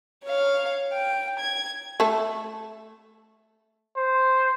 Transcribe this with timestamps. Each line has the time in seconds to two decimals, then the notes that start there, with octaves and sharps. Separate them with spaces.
0.24 C#5 F5
0.93 G5
1.39 G#6
2.00 A3 A4
3.97 C5